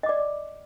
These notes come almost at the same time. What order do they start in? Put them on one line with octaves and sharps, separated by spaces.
D#5 D6 D5